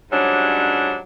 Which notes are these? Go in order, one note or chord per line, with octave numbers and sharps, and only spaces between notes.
G#2 F#3 G3 C#4 D4